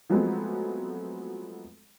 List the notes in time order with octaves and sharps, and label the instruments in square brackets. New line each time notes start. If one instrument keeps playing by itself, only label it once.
[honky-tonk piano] F3 F#3 G#3 A3 B3 C4